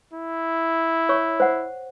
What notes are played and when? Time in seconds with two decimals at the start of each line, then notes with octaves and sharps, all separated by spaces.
0.14 E4
1.09 C#5 C#6
1.40 C5 F#5